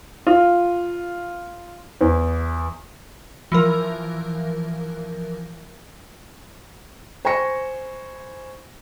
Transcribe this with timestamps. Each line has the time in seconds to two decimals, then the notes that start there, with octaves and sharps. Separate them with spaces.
0.27 F4
2.01 E2
3.52 E3 F3 A#4
7.25 C5 G#5 B5 C#6 A#6 C#7